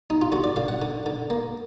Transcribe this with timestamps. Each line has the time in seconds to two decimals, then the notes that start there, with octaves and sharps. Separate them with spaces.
0.10 D#4
0.21 F4
0.32 D3 F#4
0.44 D5
0.56 D3 F5
0.68 F#5
0.82 D3
1.06 D3
1.30 A#3